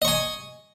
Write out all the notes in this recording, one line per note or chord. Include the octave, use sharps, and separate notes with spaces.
D#5 G#5 C#6